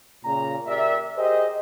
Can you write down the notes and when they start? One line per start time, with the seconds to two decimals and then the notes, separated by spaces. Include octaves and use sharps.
0.24 A#2 C#3 A#5
0.67 G4 A#4 D5 E5
1.17 G4 G#4 C5 D#5